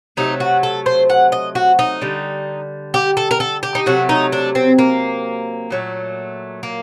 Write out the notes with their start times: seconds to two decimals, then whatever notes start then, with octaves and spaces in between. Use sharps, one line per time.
0.17 C3 F#3 A3 D#4
0.40 F#4
0.63 A4
0.86 C5
1.10 F#5
1.32 D#5
1.55 F#4
1.79 D#4
2.01 D3 G3
2.94 G4
3.17 A4
3.31 A#4
3.40 A4
3.63 G4
3.75 D#4
3.86 C3 F#3 A3 F#4
4.09 D#4
4.32 D4
4.55 C4
4.78 A#3
5.70 A#2 F#3 A3
6.63 A#3